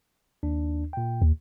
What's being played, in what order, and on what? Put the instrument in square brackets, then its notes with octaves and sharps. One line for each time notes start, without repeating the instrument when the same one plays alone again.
[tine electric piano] D#2 D4
A#2 G5
[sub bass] D#2